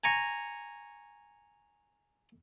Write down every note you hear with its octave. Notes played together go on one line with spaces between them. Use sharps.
G#5 A#5 C#6